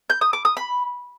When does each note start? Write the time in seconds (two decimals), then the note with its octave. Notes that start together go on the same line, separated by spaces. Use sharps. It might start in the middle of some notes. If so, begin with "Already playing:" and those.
0.10 G6
0.21 D#6
0.33 D6
0.45 D#6
0.57 B5